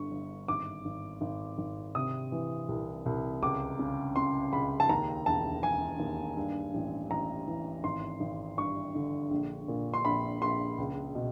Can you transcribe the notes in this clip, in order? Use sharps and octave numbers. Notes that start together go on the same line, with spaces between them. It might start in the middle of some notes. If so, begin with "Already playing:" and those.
Already playing: G1 D3 C#6
G1
G#1 D6
G#1
G#1
G#1
C3 D#6
E3
C2
C2
C#2 D6
C#3
C#3 C6
C#2 B5
A5
D#2 A#5
E1 A5
E1 G#5
D#2
G2
A1
A1 A#5
E3
G#1 C6
G#1
G2 C#6
D3
A#1
A#2
C6
A#1 B5
A#1 C6
C#2
B2